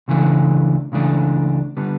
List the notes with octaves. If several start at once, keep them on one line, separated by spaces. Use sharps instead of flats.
C#2 C#3 E3 A3 D4
C#2 C#3 E3 A3 D4
D3 G3 B3